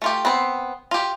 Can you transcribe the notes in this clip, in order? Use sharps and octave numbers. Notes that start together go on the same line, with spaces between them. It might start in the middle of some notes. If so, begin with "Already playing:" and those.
A3 F4 G4
B3 C4 C5
F4 G4